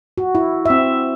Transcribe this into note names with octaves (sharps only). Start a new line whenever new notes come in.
F#4
E4
C4 E5